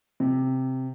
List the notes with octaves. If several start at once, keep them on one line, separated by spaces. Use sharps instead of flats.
C3